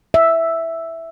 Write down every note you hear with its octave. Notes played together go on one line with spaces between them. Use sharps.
E5